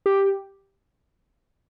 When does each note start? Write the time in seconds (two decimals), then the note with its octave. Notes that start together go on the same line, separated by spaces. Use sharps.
0.06 G4